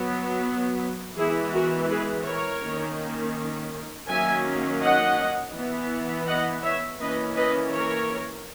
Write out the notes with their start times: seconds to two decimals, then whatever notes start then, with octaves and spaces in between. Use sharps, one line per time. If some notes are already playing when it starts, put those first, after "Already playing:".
Already playing: F#3 B3
1.18 E3 G#3 B3 E4 G#4
1.54 F#4 A#4
1.90 G#4 B4
2.26 A#4 C#5
2.64 D#3 A#3 C#4
4.08 D#3 F#3 A#3 C#4 E5 G#5
4.81 D#5 F#5
5.55 E3 B3
6.27 D#5 F#5
6.64 C#5 E5
7.00 E3 A#3 C#4 B4 D#5
7.36 B4 D#5
7.72 A#4 C#5